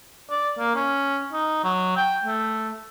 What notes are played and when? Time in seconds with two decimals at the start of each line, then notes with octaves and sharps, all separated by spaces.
0.31 D5
0.59 A#3
0.75 C#4
1.33 D#4
1.65 F#3
1.97 G5
2.24 A3